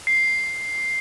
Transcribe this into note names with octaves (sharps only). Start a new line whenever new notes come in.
C7